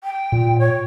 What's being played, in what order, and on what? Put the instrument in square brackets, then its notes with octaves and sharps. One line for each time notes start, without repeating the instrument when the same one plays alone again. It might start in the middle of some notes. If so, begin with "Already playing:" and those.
[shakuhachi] G5
[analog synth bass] A#2
[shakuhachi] C#5